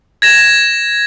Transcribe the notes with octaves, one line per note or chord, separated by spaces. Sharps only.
G#6 A#6 E7